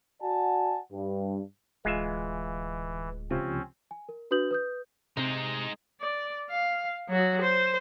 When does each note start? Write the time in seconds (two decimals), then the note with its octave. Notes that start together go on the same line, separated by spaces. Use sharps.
0.22 F#4 D5 F#5 G#5 A5
0.92 G2
1.85 D1 E3 G#3 F4 E5
3.31 C#2 C3 F3 C4 C#4
3.91 G#5
4.09 A#4
4.31 D4 F#4 B4 D#6 G6 F#7
4.51 B4 D#6 G6
5.17 C3 G#3 D#4
6.01 D5
6.50 F5
7.09 F#3 F#4
7.41 C5